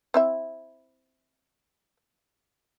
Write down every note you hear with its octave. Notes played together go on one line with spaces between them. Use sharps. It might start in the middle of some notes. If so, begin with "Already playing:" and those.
C4 E4 E5